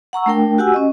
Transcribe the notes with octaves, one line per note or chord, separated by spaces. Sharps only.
F#5 A#5 C#6 E6
A3 D4 A#4 G5
F#4 G4 F#5 G#5 E6
C#4 D#5